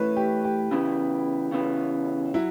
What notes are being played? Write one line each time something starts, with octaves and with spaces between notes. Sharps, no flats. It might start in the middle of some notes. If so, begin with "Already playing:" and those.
Already playing: A2 E3 A3 B4 C#5
G4
G4
C#3 E3 B3
C#3 E3 B3
F#3 E4